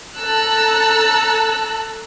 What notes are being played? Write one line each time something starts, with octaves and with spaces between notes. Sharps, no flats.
A4 A5 A#5 E6 F#6